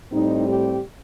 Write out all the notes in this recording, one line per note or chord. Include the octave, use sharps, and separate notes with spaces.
A2 G3 C4 D#4
G4